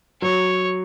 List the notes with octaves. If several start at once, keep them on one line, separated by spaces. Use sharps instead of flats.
F#3 C#5